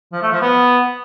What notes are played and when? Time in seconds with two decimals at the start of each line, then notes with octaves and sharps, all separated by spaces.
0.12 F3
0.22 A3
0.32 F3
0.42 B3